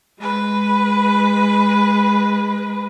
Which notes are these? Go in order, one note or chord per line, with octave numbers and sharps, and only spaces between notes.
G#3 B4